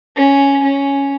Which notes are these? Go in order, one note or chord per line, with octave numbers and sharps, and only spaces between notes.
C#4
C#4